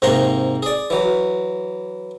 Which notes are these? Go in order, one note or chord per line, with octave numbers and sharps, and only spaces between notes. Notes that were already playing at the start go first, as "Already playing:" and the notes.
G#2 C3 A#3 A#5 C6 C#6
G#4 D5
E3 F#3